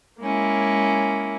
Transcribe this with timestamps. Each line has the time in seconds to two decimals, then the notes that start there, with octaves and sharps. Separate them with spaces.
0.20 G#3 A#3 C#4 E4